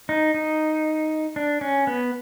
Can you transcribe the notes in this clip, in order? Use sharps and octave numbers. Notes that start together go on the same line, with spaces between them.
D#4
D#4
D4
C#4
B3